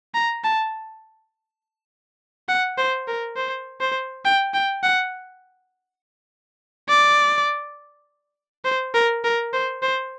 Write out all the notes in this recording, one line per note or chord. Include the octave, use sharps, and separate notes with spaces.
A#5
A5
F#5
C5
A#4
C5
C5
G5
G5
F#5
D5
C5
A#4
A#4
C5
C5